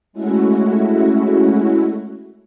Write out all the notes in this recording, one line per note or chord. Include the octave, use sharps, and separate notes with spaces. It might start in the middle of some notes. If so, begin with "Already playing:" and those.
G#3 A3 C#4 E4 F#4